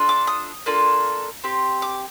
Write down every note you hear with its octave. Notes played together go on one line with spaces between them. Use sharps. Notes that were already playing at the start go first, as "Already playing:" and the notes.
Already playing: D4 F4 A4
D6
D#6
A#3 D4 F4 A4
C4 G4
D6